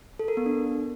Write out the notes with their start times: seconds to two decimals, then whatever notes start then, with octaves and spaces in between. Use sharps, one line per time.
0.19 A4
0.28 A#4
0.37 B3
0.46 D4